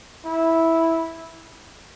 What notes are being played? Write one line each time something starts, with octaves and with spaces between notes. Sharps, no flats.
E4